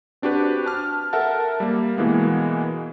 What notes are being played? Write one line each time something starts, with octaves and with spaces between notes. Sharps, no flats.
C4 D4 F#4 G4 B4
A5 F6
A4 A#4 E5 F#5 A5
G3 A#3
B2 E3 G#3 A#3 B3